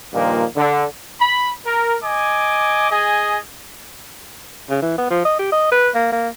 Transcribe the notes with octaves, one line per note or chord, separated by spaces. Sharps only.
G2 A#2 D#3 F3 A#3
D3
B5
A#4
D#5 G#5 D6
G#4 D#5 G#5
C#3
E3
B3
F3
D#5
G4
D#5
B4
A#3
A#3